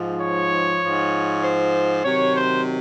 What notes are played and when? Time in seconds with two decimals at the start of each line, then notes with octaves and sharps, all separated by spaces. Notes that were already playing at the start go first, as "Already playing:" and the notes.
Already playing: G#2 F3
0.22 C#5
0.82 G#2 F3
1.44 C5
2.04 C3 D#3 F#3 C#5
2.35 C5